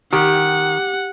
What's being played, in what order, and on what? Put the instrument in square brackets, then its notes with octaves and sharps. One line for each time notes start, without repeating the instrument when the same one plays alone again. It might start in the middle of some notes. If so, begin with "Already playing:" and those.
[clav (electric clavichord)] D#3 [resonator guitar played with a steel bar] G4 [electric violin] F#5